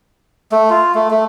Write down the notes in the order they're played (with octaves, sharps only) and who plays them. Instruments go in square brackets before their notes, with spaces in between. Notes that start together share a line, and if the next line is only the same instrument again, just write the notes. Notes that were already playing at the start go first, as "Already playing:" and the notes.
[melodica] A3
F4
A3
A3